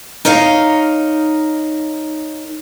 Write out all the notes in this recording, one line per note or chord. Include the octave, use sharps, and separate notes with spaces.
D#4 A#4 C#5 D#5 F5